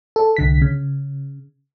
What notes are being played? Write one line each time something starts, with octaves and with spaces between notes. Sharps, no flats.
A4
C2 D3 B6
C#3